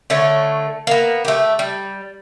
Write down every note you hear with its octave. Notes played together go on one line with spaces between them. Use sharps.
D3 A3 C#5
A#3 B3
A3 G4
G3